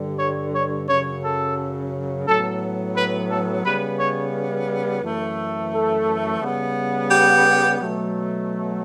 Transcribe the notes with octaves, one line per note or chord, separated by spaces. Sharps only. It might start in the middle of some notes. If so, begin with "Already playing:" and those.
Already playing: G2 D3 G3
C#5
C#5
F#2 C#3 F#3 C#5
A4
A2 F#3 B3 A4
B4
A4
C#3 G3 B3 B4
C#5
F#2 E3 A3
A4
C#3 G3 B3
G4
B2 F#3 A3